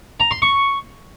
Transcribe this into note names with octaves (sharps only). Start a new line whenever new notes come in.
A#5
C6
C#6